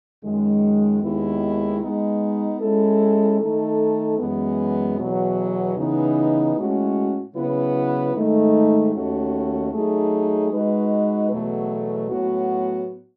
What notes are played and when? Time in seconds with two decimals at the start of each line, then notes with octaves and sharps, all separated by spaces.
0.23 F#2 D#3 G#3
1.01 D#2 D#3 G#3 B3 E4
1.81 G#3 B3 D#4
2.59 G#3 C#4 E4 A4
3.39 D#3 A3 D#4 A4
4.18 F#2 E3 G#3 B3
4.97 E2 B2 F#3
5.76 C#3 E3 B3 D#4
6.55 A2 G#3 C#4 F#4
7.34 C#3 F#3 B3 E4 B4
8.14 G#2 D#3 A3 D#4
8.93 D#2 D#3 A3 C#4 F#4
9.73 F#3 A3 D#4 G#4
10.51 G#3 D#4 F#4 B4 D#5
11.30 E2 B2 F#3 A3
12.09 A2 F#3 B3 F#4